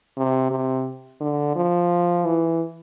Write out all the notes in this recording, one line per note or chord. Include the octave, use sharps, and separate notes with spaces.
C3
C3
D3
F3
E3